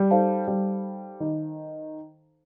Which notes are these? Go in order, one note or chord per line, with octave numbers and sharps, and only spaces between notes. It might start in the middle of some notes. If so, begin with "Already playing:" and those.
Already playing: G3
D#4 A4 C5 F5 A5
G3
D#3